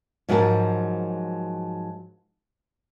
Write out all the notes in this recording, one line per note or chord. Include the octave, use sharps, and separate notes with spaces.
G#2 F3 F#3 G#4 A#4 A5